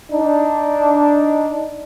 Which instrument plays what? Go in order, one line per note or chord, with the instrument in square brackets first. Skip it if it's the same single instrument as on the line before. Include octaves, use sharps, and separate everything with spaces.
[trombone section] D4 D#4